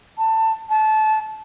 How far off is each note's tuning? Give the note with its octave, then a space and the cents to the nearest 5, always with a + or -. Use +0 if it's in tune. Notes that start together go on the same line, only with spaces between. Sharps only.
A5 +20
A5 -25